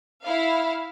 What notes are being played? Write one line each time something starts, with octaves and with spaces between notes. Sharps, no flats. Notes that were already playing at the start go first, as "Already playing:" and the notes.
E4 F5